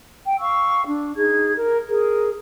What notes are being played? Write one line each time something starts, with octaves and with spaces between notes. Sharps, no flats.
G5
F5 C#6 E6
D4
D#4 G#4 G#6
A#4
G#4 A#4